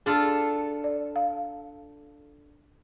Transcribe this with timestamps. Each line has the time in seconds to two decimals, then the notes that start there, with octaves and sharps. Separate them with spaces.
0.06 D4 F4 G#4 A4
0.84 D5
1.16 F5